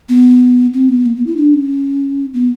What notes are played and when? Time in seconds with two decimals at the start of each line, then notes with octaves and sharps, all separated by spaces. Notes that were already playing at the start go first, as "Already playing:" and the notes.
0.09 B3
0.74 C4
0.89 B3
1.06 A#3
1.16 B3
1.27 E4
1.37 D4
1.54 C#4
2.34 B3